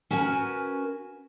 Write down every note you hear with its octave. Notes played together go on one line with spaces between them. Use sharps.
C#4 F#4 A#4 B4 G#5